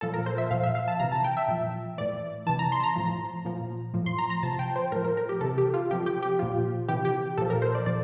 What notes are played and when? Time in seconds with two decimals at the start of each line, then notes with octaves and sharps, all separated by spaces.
0.01 A#2 F3 A4
0.14 A#4
0.26 C5
0.38 E5
0.51 A#2 F3 F5
0.63 E5
0.75 F5
0.88 A5
1.00 C3 E3 A#5
1.12 A5
1.24 G5
1.37 E5
1.48 A#2 F3
1.98 A2 E3 D5
2.47 C3 E3 A5
2.59 A#5
2.72 C6
2.83 A#5
2.96 A2 F3
3.45 A#2 F3
3.94 A2 F3
4.06 C6
4.18 A#5
4.30 A#5
4.43 C3 F3 A5
4.59 G5
4.76 C5
4.92 A2 F3 A#4
5.04 A#4
5.17 A#4
5.29 G4
5.41 C3 E3 A4
5.58 G4
5.74 F4
5.91 C3 F3 G4
6.06 G4
6.22 G4
6.39 A#2 F3 F4
6.88 C3 E3 G4
7.05 G4
7.37 A#2 F3 A4
7.50 A#4
7.62 C5
7.75 D5
7.86 A#2 F3 D5